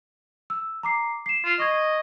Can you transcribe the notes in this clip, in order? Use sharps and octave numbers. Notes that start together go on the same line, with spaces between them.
E6
A#5 D6 C7
C7 E7
F4
D#5 C#6 G#6